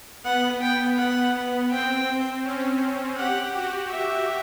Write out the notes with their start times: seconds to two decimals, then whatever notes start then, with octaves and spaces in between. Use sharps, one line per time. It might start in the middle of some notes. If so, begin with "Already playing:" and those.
0.24 B3 F#5
0.61 G5
0.98 F#5
1.71 C4 G5
2.44 C#4
3.17 G4 F#5
3.54 F#4
3.90 E5